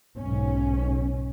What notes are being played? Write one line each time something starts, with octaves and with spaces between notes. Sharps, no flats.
B1 G#2 C#4